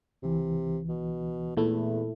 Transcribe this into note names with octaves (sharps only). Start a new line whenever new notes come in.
C#2 C3 E3
B2
E2 A#2 A3 E4